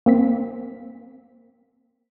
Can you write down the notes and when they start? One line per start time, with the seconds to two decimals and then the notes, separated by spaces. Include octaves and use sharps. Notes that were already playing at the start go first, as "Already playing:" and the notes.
0.06 A#3 C4 B6